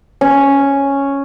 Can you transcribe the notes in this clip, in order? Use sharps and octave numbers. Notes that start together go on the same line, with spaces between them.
C#4